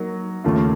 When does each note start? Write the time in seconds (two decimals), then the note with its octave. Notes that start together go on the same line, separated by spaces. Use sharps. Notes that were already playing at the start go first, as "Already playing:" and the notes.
Already playing: F#3 A#3 D#4
0.44 D#2 C#3 A3 C#4 F4